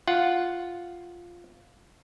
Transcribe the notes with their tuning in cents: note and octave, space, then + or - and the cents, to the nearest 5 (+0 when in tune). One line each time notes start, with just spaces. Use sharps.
F4 +0 F#5 +0